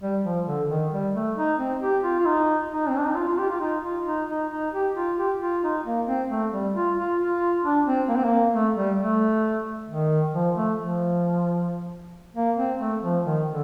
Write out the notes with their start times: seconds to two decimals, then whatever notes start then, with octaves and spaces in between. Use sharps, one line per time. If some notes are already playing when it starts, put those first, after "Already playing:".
0.01 G3
0.24 F3
0.46 D3
0.69 D#3
0.92 G3
1.14 A3
1.37 D#4
1.58 C4
1.82 G4
2.04 F4
2.19 F4
2.26 D#4
2.71 D#4
2.88 C4
2.97 D4
3.07 D#4
3.15 F4
3.28 F4
3.38 G4
3.50 F4
3.61 D#4
3.83 F4
4.06 D#4
4.28 D#4
4.51 D#4
4.73 G4
4.95 F4
5.17 G4
5.41 F4
5.62 D#4
5.85 A#3
6.07 C4
6.30 A3
6.52 G3
6.75 F4
6.98 F4
7.19 F4
7.64 D4
7.86 C4
8.09 A#3
8.17 C4
8.25 A#3
8.54 A3
8.76 G3
8.99 A3
9.88 D#3
10.33 F3
10.56 A3
10.79 F3
12.35 A#3
12.58 C4
12.80 A3
13.03 F3
13.25 D#3
13.47 D3